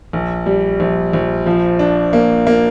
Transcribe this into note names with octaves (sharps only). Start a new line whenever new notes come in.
A#1
G3
A#1
A#1
F3
D4
A#3
A#3